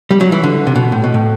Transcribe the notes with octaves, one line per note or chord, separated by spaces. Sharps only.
G3
F#3
E3
D3
C3
B2
A2
B2
A2